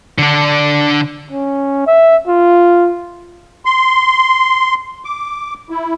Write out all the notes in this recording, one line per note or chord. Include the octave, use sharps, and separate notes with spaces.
D3 D4
C#4
E5
F4
C6
D6
E4